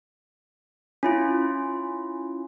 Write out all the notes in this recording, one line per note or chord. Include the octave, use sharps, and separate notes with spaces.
C#4 E4 F4